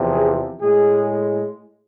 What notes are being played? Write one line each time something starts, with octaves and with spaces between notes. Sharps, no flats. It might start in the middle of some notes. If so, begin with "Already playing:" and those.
Already playing: E2 C3 F3
G#4
A2 G#3 G#4